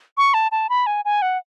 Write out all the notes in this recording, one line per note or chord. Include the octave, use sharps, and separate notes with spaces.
C#6
A5
A5
B5
G#5
G#5
F#5